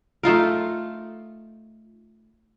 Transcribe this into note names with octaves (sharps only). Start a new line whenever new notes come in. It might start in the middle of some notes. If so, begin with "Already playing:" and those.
A3 D#4 F4 A#4